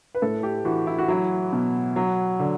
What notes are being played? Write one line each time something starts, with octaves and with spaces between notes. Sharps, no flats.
B4
A2 A4
G4
E3 F#4
E4
F#4
F#3 E4
B2
F#3
D3